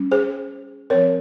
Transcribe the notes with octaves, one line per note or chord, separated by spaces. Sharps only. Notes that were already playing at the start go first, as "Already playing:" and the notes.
Already playing: G3 C#4
G#4 C5
F3 C4 A#4 C#5